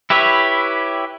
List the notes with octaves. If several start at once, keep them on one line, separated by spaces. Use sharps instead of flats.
E4 G4 B4 C#5 E5